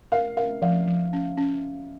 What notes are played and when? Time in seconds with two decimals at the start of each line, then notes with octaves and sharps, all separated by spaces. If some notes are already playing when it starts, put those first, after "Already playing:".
0.12 A#4 F5
0.37 A#4 F5
0.62 F3 F5
0.87 F3
1.13 C#4
1.37 C#4